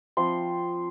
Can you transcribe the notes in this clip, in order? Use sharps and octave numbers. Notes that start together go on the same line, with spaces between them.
F3 C4 F4 C6